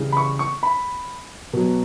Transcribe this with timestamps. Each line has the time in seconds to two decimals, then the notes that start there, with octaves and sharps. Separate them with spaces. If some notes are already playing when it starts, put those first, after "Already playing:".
Already playing: C#3 E3 G3
0.12 B5
0.17 C#6
0.39 C#6
0.63 B5
1.53 B2 F#3